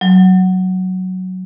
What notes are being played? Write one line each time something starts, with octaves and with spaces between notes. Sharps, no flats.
F#3